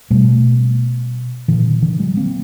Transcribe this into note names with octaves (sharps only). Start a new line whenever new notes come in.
B2 G3 A3
A#2 D3 E3
D#3
D3 E3
F#3 G#3
A#3 C4